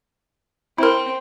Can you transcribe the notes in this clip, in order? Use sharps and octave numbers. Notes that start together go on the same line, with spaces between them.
C4 E4 A#4